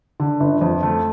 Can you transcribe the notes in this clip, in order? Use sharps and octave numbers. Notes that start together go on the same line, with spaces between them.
D3
G1
F2
A3